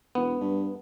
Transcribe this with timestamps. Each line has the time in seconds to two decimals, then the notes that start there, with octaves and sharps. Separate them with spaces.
0.15 E1 B3
0.41 G2